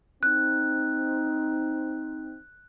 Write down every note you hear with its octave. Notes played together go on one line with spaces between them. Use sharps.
C4 D#4 F#6